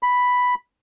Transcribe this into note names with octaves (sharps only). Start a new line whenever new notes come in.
B5